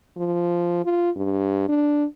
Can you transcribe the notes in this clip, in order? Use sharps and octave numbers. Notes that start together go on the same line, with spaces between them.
F3
F4
G2
D4